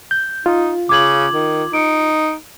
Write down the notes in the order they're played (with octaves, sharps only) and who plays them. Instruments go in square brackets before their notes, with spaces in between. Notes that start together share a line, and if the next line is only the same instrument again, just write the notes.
[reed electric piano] G6
[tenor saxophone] D#4 [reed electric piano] F4
[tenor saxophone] C#3 [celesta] D6 G#6 F#7
[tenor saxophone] D#3
[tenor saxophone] D#4 [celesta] C#7 D7